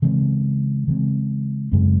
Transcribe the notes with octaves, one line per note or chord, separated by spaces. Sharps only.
C#3 E3 G#3 C4
C#3 E3 G#3 C4
F#2 C#3 G#3 C4